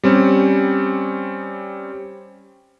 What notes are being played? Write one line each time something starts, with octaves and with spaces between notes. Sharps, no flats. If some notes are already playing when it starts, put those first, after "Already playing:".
G3 C4 C#4